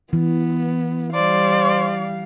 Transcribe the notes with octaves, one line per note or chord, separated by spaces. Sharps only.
E3 B3
G3 C5 D5 F5